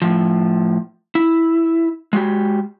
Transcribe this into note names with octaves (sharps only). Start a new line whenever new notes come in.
A2 F3
E4
G#3 F#4 G4